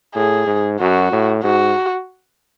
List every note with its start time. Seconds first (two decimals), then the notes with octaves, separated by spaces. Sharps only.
0.15 A2 G#4
0.47 G#2
0.80 F#2 F#4
1.12 A2
1.44 G#2 F#4